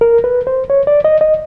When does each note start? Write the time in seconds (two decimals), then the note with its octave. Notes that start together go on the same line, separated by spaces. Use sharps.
0.01 A#4
0.24 B4
0.47 C5
0.70 C#5
0.87 D5
1.05 D#5
1.21 D#5